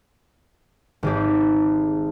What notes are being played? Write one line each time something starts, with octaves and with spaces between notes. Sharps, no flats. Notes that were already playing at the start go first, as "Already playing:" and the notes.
G#1 G#3 G4